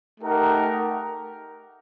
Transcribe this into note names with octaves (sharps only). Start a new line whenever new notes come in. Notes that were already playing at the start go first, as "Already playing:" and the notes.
A3 D#4 G4 A#4 F#5